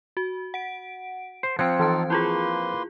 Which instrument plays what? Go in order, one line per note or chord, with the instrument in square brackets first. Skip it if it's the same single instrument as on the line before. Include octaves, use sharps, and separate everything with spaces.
[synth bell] F#4
F#5 D7
[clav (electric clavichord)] C5
[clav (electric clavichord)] F3 C4 [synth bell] F#6 G#6 C#7
[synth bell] E3 A5 [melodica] D#4 F4 A4
[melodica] A#3 B4 C6 [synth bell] E4 F4 G#4